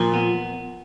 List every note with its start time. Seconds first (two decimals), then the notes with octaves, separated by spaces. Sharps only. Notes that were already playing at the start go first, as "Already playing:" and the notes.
Already playing: A#2 F3
0.14 B3